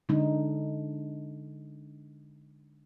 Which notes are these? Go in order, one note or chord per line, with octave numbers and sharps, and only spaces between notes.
D3 G#3 D4 D#4